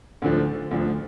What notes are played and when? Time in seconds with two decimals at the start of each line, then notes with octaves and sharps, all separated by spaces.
0.22 D2 D3 F3
0.71 D2 D3 F3